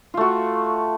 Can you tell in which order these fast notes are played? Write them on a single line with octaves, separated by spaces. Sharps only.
F4 A3 F#4